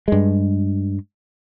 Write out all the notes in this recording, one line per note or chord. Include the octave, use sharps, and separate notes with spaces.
G2 G#3